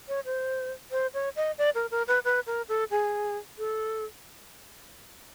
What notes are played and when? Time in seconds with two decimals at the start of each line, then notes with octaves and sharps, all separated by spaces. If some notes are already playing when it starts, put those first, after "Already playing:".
0.08 C#5
0.25 C5
0.91 C5
1.14 C#5
1.36 D#5
1.58 D5
1.75 A#4
1.91 A#4
2.08 B4
2.24 B4
2.47 A#4
2.69 A4
2.91 G#4
3.58 A4